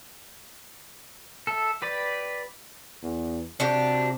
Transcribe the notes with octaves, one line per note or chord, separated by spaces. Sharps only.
A4 E5
G4 B4 D5
E2
C3 D4 F#4 G4